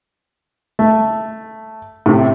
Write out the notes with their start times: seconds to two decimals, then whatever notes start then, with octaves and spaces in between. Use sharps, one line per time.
0.79 A3
2.06 A2 C3